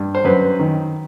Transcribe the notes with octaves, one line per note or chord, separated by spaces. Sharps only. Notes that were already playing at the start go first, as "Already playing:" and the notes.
Already playing: G2
C5
F#2 B4
D#3